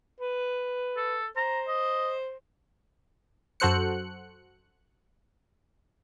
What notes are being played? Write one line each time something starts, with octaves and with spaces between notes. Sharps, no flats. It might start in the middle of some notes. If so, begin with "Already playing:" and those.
B4
A4
C5 A#5
D#5
F#2 F#4 A4 C5 F#6 C#7